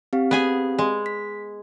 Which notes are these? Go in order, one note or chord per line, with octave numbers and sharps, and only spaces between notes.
C4 G4 F5
B3 G#4 G#5
G#3
B6